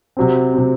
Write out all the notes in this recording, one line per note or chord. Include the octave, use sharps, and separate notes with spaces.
C3 F#3 C4
C3 F#3 C4